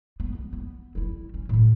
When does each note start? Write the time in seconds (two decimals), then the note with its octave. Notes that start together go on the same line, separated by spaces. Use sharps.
0.20 B3
0.35 G3
0.53 B3
0.95 G3 E4
1.34 C#4
1.49 A2 C#3